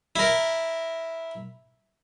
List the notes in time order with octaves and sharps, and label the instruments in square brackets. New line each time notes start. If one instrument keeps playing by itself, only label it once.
[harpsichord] E4 A#4